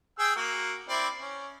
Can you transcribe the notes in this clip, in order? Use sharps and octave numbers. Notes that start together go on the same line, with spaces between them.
G#4 G5 E6
A#3 F#4 A#4
C4 E4 D5
C#4